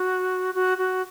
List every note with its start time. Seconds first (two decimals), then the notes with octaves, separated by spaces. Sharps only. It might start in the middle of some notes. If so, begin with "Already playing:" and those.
Already playing: F#4
0.54 F#4
0.78 F#4